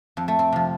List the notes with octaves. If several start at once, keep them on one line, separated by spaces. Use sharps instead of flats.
F2 C4
A3
C4
C3 F3